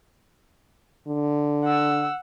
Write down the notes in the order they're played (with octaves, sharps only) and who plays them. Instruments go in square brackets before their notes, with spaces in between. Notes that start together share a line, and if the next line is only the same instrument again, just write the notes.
[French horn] D3
[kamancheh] F#5 E6